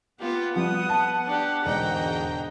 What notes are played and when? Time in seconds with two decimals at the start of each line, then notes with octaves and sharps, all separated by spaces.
0.20 B3 F4 G4 F#5
0.56 F3 G3 D#6
0.89 A5
1.26 D4 G4
1.65 E1 G#2 D3 D#5 G5 A#5